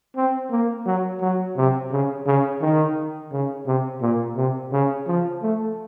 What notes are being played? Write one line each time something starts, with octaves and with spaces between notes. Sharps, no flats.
C4
A#3
F#3
F#3
C3
C#3
C#3
D#3
C#3
C3
A#2
C3
C#3
F3
A3